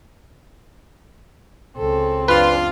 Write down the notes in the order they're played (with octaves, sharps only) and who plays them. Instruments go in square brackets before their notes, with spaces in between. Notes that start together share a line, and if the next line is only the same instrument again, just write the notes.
[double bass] C#2 C4 [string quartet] A4
[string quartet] F#2 D4 D5 [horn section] F4 [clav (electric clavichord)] B4